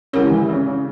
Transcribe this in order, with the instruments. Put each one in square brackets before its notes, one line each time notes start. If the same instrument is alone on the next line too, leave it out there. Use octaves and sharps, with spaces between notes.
[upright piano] C#3 [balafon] G#3 E4 G4 A#4 C#5
[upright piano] E3
C#3
C#3